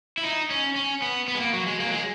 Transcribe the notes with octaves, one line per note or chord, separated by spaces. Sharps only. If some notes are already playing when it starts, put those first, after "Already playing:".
E4
D#4
C#4
C#4
B3
B3
G#3
A#3
F#3
G#3
A#3
F#3
G#3